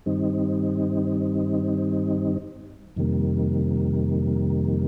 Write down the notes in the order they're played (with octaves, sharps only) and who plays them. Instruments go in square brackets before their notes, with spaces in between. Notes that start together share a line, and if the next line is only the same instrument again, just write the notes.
[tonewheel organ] G2 D#3 G3 C4 D#4
F2 C3 D#3 G3 A#3